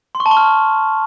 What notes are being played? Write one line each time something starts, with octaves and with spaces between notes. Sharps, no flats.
C6
C#6
A5
C#6
F6